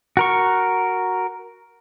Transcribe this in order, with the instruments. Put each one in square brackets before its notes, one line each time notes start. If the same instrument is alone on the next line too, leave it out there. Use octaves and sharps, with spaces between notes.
[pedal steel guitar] F#4 A#4 C#6